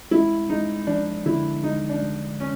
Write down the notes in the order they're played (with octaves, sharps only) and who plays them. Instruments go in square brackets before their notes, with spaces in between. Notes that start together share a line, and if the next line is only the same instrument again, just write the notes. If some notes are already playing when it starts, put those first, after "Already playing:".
[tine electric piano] G#3 [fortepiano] E4
[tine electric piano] G#3 [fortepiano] D#4
[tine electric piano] F3 [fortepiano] D4
[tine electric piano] D3 [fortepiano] E4
[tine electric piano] G#3 [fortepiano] D#4
[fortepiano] D4
[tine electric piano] G#3
[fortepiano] C#4